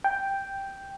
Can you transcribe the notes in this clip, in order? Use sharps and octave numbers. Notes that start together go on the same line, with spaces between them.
G5